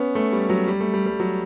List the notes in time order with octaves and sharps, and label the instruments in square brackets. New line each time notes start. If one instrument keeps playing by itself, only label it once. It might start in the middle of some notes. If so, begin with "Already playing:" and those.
Already playing: [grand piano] B3 C#4
A3
G3
F#3
G3
A3
G3
G3
F#3